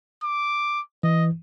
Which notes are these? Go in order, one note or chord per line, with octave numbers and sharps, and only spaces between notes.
D6
E3 D#5